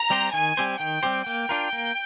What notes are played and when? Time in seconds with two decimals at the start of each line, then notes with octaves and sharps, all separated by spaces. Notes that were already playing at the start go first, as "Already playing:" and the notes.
Already playing: A#5
0.10 G3 C4 G4 C5
0.33 D#3 G#5
0.57 G3 C4 G4 C5
0.80 D#3 G5
1.03 G3 C4 G4 C5
1.26 A#3 G5
1.49 D4 F4 A#4
1.73 A#3